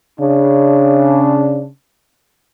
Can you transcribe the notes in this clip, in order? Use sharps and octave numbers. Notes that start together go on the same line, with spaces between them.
C#3 D4